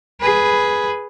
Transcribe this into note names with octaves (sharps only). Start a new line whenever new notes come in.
G#4 B4